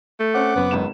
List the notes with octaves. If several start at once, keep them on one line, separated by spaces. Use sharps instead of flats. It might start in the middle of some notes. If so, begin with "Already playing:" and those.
A3
C4 C#4 C5 F#5 D6
F#1 F#2 B3
G#1 C#2 E7